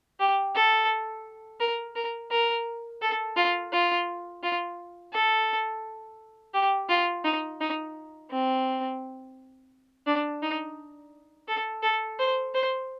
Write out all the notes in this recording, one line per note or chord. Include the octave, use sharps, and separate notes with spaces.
G4
A4
A#4
A#4
A#4
A4
F4
F4
F4
A4
G4
F4
D#4
D#4
C4
D4
D#4
A4
A4
C5
C5